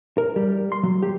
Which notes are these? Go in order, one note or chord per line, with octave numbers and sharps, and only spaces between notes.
A#4
G3
C6
F#3
G4